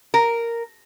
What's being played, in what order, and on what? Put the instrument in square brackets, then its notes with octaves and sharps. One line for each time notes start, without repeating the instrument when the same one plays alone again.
[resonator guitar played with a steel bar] A#4